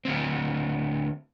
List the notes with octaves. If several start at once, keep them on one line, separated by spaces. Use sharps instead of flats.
D2 C4